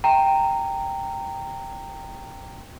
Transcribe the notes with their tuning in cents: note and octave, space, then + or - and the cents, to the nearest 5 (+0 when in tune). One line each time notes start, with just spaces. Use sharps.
G5 +0 A#5 -15